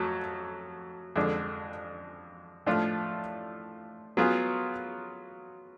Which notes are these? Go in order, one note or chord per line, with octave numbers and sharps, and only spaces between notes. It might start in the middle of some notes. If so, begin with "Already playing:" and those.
Already playing: F2 F#3 A3
F2 D3 G#3 D4
A2 F3 A3 D4 F4
F#3 B3 F4 G#4